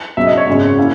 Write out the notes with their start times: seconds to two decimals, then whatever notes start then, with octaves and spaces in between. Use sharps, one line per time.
0.17 C#2 B2 F#3 E5
0.27 D#5
0.37 C#5
0.47 G#1 F#2 C#3 G#3
0.78 A#3 C#4 E4